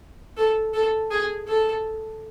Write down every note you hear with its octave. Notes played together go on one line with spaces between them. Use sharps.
A4
A4
G#4
A4